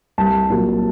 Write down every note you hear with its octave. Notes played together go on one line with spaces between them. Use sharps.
C2 A5
A#2 F#3